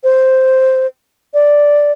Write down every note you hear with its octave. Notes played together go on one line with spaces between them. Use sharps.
C5
D5